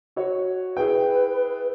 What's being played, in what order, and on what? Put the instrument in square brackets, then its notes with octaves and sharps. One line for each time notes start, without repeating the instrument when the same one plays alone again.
[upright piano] F#4 C#5
[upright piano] E4 G#4 G5 [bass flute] B4